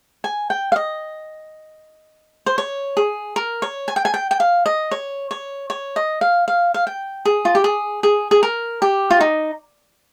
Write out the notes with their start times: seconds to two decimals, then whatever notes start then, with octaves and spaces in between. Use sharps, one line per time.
0.24 G#5
0.50 G5
0.72 F5
0.76 D#5
2.46 C5
2.58 C#5
2.97 G#4
3.36 A#4
3.62 C#5
3.88 G#5
3.96 G5
4.05 G#5
4.14 G5
4.31 G5
4.40 F5
4.66 D#5
4.91 C#5
5.31 C#5
5.70 C#5
5.96 D#5
6.21 F5
6.48 F5
6.74 F5
6.87 G5
7.25 G#4
7.45 F4
7.55 G4
7.64 G#4
8.03 G#4
8.31 G#4
8.43 A#4
8.82 G4
9.11 F4
9.21 D#4